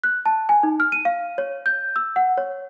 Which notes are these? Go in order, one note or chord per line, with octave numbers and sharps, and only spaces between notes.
F#6
A5
G#5
D#4
F6
D#7
F5
C#5
G6
E6
F#5
C#5